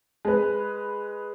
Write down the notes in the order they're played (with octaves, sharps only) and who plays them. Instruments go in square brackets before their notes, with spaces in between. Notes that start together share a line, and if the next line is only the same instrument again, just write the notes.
[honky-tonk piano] G#3 B4